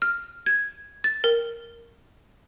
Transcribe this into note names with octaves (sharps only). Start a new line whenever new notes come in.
F6
G#6
A6
A#4